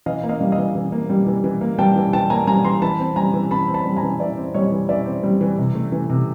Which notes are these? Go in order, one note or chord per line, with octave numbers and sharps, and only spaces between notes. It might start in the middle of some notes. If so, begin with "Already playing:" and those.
E3 D#5 F5
A#3
D#5 F5
G3
D#5 F5
E3
E3
A#3
G3
E3
E3
A#3
G3 G5 A5
E3
E3 G5 A5
A#3 G#5 A#5
G3 G#5 A#5
E3 A#5 C6
E3 A5 B5
C4
G3 G#5 A#5
E3
E3 A5 B5
C4
A5 B5
G3
G#5 A#5
E3
E3 D5 E5
C4
G3 C#5 D#5
E3
E3 D5 E5
C4
G3
E3
C3
A3
E3
C3